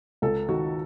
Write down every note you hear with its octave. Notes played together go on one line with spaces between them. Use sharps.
C#2 A4
D#3 F#4